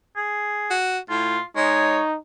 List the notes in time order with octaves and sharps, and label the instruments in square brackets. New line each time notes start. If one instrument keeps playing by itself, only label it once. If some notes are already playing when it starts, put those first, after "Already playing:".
[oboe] G#4
[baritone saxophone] F#4
[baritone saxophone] A2 [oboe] F4
[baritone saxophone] G#3 [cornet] D#4 [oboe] C#5